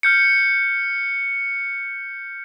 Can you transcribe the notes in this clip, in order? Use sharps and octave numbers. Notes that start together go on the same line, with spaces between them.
F6 G6 C#7